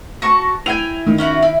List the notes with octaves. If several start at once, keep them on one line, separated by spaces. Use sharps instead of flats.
F#4 A5 C#6 A#6
E4 G5 G#5 D#7 F7
D#3
C#4 E4 F#4
E4